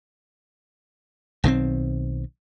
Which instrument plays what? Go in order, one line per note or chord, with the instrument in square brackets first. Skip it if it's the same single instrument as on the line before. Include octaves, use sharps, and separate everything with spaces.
[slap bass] B1 D#3 E3 C4